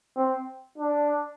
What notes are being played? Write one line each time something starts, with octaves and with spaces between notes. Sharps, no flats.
C4
D4